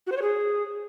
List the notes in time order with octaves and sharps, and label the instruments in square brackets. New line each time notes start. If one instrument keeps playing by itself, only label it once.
[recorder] F#4
C5
C#5
G#4